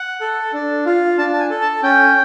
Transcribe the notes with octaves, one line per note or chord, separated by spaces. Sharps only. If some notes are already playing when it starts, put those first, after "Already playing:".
Already playing: F#5
A4
D4
F4
D4 A5
A5
G#5
A4
A5
C#4 G5